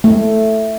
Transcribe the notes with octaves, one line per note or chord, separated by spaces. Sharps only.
A3